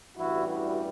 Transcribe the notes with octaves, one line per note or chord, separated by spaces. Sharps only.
A1 G2 E3 G3 E4 F#4
E4 F#4